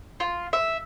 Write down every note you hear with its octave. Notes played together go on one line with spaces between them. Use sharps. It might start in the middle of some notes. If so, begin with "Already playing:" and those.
F4
E5